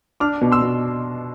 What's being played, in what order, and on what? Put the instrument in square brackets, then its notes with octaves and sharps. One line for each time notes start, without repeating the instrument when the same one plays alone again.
[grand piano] D4 D6 F6
B2
C6 E6
B2